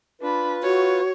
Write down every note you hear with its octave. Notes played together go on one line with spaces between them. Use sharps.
D4 F4 B4 B5
F#4 C#5